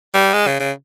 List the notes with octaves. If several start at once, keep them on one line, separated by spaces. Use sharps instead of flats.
G3
G#3
C#3
C#3